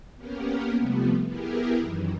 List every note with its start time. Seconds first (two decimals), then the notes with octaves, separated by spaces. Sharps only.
0.16 A#3 B3 C#4 G4 A#4
0.78 C3 F3 G3 A3 B3
1.26 B3 E4 G4 G#4 A#4
1.78 F#2 D#3 E3